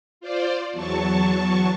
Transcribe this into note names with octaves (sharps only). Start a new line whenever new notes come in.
F4 C5 D5
E2 F#3 A5 C#6